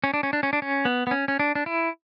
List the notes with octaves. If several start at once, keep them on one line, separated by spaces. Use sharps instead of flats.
C#4
D4
C#4
D4
C#4
D4
C#4
B3
B3
C#4
C#4
D4
D4
E4